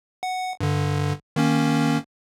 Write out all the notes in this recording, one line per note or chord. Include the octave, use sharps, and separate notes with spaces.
F#5
G2 D3
D#3 A#3 C#4